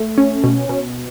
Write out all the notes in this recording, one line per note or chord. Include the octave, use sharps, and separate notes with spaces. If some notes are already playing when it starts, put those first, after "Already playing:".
Already playing: A3
C#4
B2
B2